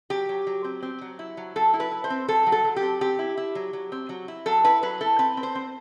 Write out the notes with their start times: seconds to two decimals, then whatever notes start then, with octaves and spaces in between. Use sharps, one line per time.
0.10 F#3 G4
0.29 F#3
0.47 F#3
0.64 C4
0.82 C4
1.01 F#3
1.19 E4
1.37 F#3
1.56 F#3 A4
1.74 E4
1.80 B4
1.91 E4
2.04 C5
2.10 C4
2.28 F#3 A4
2.46 F#3
2.52 A4
2.64 F#3
2.76 G4
2.83 C4
3.01 C4 G4
3.19 E4
3.37 E4
3.55 F#3
3.73 F#3
3.92 C4
4.09 F#3
4.28 E4
4.46 F#3 A4
4.64 E4 B4
4.83 F#3 B4
5.01 E4 A4
5.19 C4 B4
5.37 C4
5.43 C5
5.55 C4